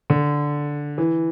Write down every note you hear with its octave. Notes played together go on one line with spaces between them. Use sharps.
D3
E3